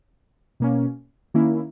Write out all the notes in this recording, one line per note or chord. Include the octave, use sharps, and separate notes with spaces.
B2 A#3 C#4
D#3 A#3 C#4 E4